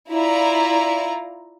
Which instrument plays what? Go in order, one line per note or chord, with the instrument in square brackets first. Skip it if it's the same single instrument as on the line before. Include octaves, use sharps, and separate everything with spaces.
[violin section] E4 F4 D5 A#5